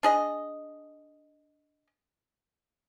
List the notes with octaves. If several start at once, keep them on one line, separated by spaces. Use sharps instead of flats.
D4 G#4 D#5